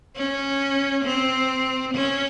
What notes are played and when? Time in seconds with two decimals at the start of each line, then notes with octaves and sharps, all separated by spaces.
0.16 C#4
1.05 C4
1.95 C#4